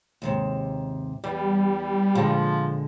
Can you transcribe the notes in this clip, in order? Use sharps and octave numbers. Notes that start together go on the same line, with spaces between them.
D#2 G#2 C3
E2 G3
A#2 D3 F3 G#3